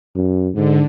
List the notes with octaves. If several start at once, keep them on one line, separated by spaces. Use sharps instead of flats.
F#2
G#2 D3